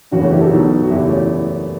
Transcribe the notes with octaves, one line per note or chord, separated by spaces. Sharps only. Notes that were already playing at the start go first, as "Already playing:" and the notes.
F#1 E2 C#3 E3 D4 F#4
A3 C#4
E4 G4
F#4 A4
B1 B2
F#4
F#1 E2 B2 E4 G4
A3 C#4